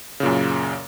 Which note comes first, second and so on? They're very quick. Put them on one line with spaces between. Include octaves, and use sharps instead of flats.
C#3 A#2 F#2